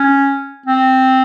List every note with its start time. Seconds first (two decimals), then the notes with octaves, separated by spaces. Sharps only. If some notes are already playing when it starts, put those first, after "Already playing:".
Already playing: C#4
0.66 C4